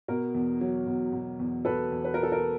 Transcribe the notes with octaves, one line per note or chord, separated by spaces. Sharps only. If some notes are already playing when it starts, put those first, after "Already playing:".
B2 A#4
E2
F#3
B2
B2
E2
B2 A4 B4
E2
B4
B2 A#4
A4
A#4